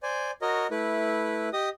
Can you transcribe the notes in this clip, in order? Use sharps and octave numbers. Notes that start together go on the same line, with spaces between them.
C5 D5 G#5
F#4 A#4 C#5 D#5
A3 E4 B4
G4 D#5 D#6